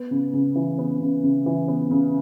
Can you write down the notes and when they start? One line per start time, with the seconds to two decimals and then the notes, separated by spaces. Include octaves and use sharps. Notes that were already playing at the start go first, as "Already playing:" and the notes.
Already playing: B3
0.11 C#3
0.33 C#3
0.55 E3
0.78 B3
1.01 C#3
1.23 C#3
1.46 E3
1.68 B3
1.91 C#3